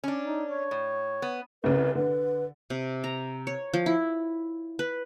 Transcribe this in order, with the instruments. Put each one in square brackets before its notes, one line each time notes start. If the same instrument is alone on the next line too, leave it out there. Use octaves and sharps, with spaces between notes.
[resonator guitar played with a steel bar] C#4 D4
[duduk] D#4
C#5
[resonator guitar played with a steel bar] A2
B3
[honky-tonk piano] C2 C#3 [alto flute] B4
[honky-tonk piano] D3 [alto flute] B4
[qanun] C3
A#5
C#5
F3
E4
B4